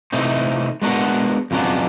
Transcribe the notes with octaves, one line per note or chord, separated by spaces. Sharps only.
C3 E3 A3 C4 D#4
G#3 B3 D4 F#4 A#4
F2 C#3 F#3 B3 D4